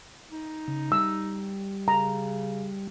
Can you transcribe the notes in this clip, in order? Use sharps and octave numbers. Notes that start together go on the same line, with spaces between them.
D#4
C#3
G3 E6
C#3 A#5